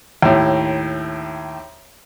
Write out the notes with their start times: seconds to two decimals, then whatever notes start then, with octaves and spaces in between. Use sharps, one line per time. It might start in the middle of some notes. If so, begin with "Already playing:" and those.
0.22 D#2 A2